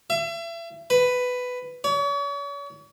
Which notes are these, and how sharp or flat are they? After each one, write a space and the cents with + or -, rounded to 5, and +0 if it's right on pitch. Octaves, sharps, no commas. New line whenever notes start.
E5 +35
B4 +10
C#5 +40